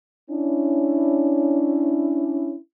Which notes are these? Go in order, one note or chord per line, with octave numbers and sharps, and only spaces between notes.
C#4 D4 E4